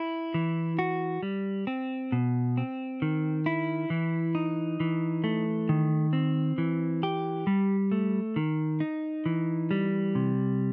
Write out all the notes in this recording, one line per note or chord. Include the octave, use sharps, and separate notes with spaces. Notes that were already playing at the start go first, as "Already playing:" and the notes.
Already playing: E4
E3
F#4
G3
C4
B2
C4
D#3
E4
E3
D#4
E3
A3
D#3
C4
E3
G4
G3
A3
D#3
D#4
E3
G3
C3